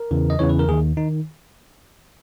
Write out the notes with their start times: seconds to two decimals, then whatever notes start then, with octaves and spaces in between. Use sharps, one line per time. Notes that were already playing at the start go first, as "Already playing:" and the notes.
Already playing: A#4
0.11 E2 C#3 E3
0.30 D#5
0.39 E2 C#3 E3 C#5
0.49 B4
0.59 A#4
0.68 D#2 D#3 G#4
0.97 D#3 D#4